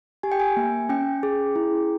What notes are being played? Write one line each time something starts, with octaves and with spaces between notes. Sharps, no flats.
G4 G#5
G5
G#5
A#3
C#4 G5
G#4
E4